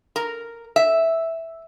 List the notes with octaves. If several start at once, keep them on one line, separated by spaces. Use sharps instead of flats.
A#4
E5